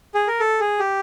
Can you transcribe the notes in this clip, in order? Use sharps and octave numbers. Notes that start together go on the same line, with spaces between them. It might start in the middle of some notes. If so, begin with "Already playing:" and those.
G#4
A#4
A4
G#4
G4